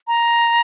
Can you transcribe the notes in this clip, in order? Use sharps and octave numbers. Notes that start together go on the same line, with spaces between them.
A#5